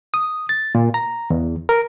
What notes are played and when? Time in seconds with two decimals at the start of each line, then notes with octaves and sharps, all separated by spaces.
0.14 D#6
0.49 A6
0.75 A#2
0.94 A#5
1.30 E2
1.69 A#4